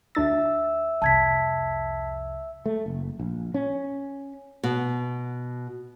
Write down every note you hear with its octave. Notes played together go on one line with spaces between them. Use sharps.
D2 D4 E5 E6 A6
C2 F2 A5 G#6 B6
A3
F#1
A#1
C#4
B2